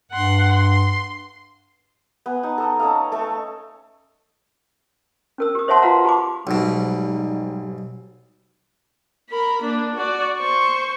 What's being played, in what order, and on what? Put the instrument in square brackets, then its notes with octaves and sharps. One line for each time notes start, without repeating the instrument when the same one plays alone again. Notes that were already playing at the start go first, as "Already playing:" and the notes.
[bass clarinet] G2 [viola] F#5 C6
[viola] C6
[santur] B3 G#5
D#4 A5
A4 D#5 A#5
C#4 A4 D#5 F5
A3 A4 A5 C#6
[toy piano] C#4 A#4 E6
G4 D#6
C5 C#5 E5 F#5 A5 C6
F4 F#4 B4 F5 F#5 A#5
G4 A5 B5 D6
[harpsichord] B1 B2 [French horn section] G#2 G3
[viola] A#4 B5
A#3 D4
F#4 D5
C5 C#6